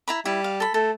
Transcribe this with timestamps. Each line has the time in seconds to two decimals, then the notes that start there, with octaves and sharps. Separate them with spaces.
0.08 E4 A#5 B5
0.25 G3 E4
0.44 F5
0.60 A4 B5
0.74 A3 A4